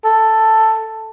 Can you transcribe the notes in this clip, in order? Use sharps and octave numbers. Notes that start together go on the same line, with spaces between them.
A4